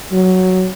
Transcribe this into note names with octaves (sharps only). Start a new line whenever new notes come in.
F#3